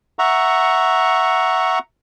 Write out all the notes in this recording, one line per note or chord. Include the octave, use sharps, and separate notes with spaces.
E5 F#5 A#5 C#6